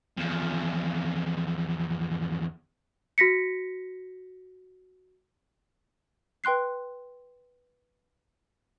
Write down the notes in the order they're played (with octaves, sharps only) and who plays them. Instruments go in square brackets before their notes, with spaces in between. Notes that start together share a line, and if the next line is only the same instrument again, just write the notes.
[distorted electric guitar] E2 F3
[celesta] F#4 A#6 B6 C#7
[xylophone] B4 G5 C6 F#6 C7